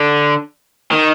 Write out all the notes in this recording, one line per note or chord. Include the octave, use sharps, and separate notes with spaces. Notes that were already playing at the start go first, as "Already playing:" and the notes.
Already playing: D3
D#3